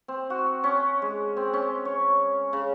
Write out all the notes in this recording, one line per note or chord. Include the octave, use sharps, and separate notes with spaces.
C4
F#4
C#4
G#3
C4
C#4
C#5
C#3